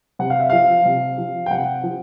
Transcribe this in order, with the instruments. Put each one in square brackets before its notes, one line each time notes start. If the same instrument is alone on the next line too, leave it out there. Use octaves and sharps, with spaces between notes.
[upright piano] C3 F#5
F5
E5
F3 F5
C3
F3
G5
C3 F#5
F3